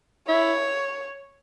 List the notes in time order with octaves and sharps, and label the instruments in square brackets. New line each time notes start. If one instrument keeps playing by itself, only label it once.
[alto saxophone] E4 [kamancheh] C#5